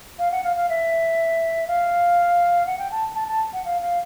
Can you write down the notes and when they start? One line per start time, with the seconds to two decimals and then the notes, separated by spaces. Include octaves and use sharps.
0.19 F5
0.32 F#5
0.44 F5
0.56 F5
0.69 E5
1.67 F5
2.66 F#5
2.79 G5
2.91 A5
3.15 A5
3.28 A5
3.53 F#5
3.65 F5
3.81 F5